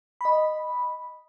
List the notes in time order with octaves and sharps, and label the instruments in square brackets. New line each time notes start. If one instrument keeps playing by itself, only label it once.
[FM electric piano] D#5 B5